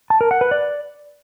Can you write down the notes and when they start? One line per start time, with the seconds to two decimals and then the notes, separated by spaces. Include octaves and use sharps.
0.10 A5
0.21 A#4
0.31 F#5
0.41 B4
0.51 D5